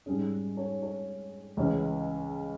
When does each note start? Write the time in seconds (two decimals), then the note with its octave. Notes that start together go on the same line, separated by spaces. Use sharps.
0.06 G#2 G3 C#4 G#4
0.57 C#5
0.82 C#5
1.57 C#2 C#3 E3 G#3 C#4